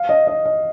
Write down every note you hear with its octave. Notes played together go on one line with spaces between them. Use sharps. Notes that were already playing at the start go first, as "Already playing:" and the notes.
Already playing: F5
D#5
D#5
D#5